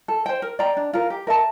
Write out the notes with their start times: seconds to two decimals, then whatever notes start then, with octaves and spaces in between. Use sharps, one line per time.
0.08 A4
0.26 C5 G5
0.42 A#4
0.59 D5 G5 A#5
0.77 D4
0.93 F4 A#4
1.10 G4
1.27 A#4 E5 A5